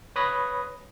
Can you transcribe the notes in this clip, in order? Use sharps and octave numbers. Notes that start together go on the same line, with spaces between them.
B4 C#5 B5 D#6 A#6